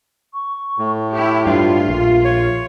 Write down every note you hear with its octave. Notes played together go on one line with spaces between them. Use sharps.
C#6
A2
E4 G4 C#6
G2 F4 E5
A#1
C#5